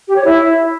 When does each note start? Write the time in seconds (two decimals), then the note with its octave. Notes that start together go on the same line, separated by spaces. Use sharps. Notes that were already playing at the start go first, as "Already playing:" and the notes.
0.08 G4
0.16 C#5
0.24 E4